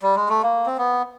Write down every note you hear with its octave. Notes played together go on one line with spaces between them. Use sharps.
G3
G#3
A3
A#3
C4
B3